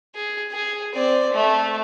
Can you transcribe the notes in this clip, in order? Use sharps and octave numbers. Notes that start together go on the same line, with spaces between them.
G#4
G#4
C4 D5
A3